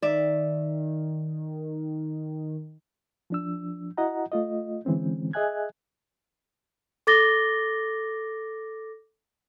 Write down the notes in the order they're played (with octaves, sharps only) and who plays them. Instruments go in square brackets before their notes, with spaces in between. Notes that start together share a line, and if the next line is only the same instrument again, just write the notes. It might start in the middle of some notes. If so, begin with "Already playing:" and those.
[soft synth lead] D#3 [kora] D5 E5
[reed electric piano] F3 D4 E6
E4 F#4 D#5 F#5 A#5
A3 F4 D#5
D3 E3 G#3 C4 C#4
G#4 D#5 E5 G#5 F#6 G#6
[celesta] A4 D6 A6 A#6 G7